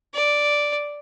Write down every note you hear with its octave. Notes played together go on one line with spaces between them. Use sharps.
D5